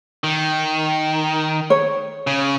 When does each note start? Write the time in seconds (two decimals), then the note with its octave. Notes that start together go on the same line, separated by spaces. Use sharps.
0.24 D#3
1.70 C#5
2.27 C#3